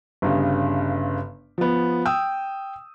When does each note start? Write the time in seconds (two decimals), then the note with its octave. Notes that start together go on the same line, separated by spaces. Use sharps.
0.22 G1 G2 C#3
1.58 F3 B3
2.05 G5 D#6 E6